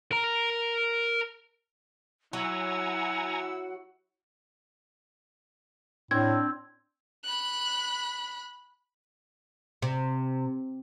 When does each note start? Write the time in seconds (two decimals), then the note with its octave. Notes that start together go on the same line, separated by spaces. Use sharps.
0.12 A#4 A#5
2.33 F#3 E4 F#5 G#5 A#5 E6
6.11 A2 C4 D4 G#6
7.24 B5 F#6
9.82 C3